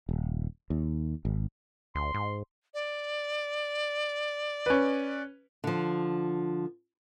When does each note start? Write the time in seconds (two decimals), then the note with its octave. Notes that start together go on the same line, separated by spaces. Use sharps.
0.09 D#1
0.70 D#2
1.25 G#1
1.95 D2 C6
2.14 G#2
2.74 D5
4.66 C#4 B4
5.64 D3 F3